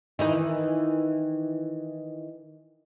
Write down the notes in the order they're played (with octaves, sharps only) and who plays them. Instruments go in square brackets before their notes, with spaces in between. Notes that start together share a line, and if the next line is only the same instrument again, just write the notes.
[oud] D#3 E3 D#4